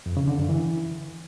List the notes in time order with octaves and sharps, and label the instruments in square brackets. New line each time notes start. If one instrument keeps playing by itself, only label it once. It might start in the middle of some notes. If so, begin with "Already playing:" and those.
[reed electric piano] F2
C#3
D3
F#2
E3